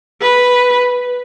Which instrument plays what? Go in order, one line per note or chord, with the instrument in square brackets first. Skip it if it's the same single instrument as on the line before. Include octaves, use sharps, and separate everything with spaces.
[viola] B4